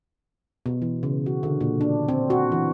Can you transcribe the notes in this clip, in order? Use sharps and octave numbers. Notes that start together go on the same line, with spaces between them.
B2
E3
C#3
F#4
D3
A#2
D4
C4
F#4
E3